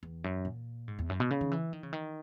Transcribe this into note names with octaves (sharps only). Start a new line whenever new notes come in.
E2
F#2
A#2
G#2
E2
F#2
B2
C#3
D#3
E3
D#3
C#3
D#3